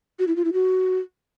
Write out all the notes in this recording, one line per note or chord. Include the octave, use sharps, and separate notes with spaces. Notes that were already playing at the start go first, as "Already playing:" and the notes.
F#4
E4
F4
E4
F#4